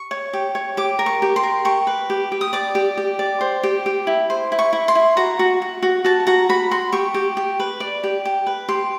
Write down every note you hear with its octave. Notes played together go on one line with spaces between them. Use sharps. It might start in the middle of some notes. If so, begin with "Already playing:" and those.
Already playing: C#6
C#5
G4
C#5
G4 D6
A#4
C#6
G4
C6
A#4
G4 C#6
B4
G4
G4
D#6
D5 D6
G4
G4
D5
C5
G4
G4
E4
C5
E4
C#6
E4
C6
E4
F#4 A#5
F#4
F#4
F#4
F#4 A5
F#4 A#5
F#4 B5
F#4 C6
G4 C#6
G4
G4
B4
D5
G4
G4
B4
G4 C6